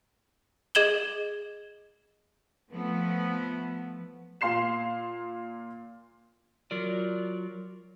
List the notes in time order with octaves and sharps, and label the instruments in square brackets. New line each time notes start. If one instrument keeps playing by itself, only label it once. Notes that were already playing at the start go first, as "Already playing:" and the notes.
[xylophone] G#4 D#5 G#6 E7 F#7 G7
[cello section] F3 A3 B3
[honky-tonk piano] A#2 F5 C6 C7 E7
[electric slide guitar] F#3 F4 A#4 D5